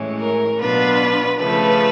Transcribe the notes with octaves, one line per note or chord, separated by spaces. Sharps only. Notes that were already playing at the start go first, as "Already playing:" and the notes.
Already playing: A2 E3 G#3 C#4
A#4
B2 F#3 B3 D4 F4 B4
C#3 F3 A3 B4